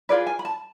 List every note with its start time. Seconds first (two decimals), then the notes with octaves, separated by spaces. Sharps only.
0.09 F4 G#4 B4 D5
0.27 G#5
0.39 B5
0.45 A5